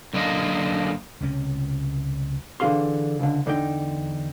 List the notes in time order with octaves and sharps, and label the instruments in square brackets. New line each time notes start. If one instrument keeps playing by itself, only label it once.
[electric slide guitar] F#2 D3 A#3 D#5
[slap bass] C#2 C3 C#4
[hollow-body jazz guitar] D3 E3 F4 G#4 F5 C6
C#2 D3
E2 D3 D#4 A4 G5